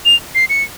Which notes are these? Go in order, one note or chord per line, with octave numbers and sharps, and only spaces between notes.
F7
C7
C#7